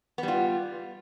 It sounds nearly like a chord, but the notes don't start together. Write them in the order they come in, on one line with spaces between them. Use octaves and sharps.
B3 G3 F4